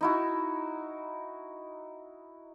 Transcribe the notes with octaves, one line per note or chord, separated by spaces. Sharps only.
D#4 E4 F#4